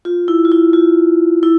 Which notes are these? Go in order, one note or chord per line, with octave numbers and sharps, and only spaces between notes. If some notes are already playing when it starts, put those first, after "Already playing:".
F4
E4
F4
E4
F4
E4